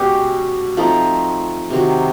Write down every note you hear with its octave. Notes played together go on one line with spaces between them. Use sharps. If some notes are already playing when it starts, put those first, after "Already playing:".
Already playing: B2 G#3 C#4 G4
F3 A3 C4 D#4
C3 D#3 F#3